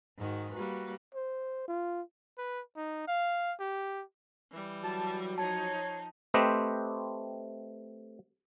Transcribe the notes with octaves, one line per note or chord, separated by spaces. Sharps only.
G#2 D#3 F#4
G3 A#3 F#4 B4
C5
F4
B4
D#4
F5
G4
E3 G3
F#3 A5
F3 D#4 C#5 A5
A3 C4 G4 B4 C5 D#5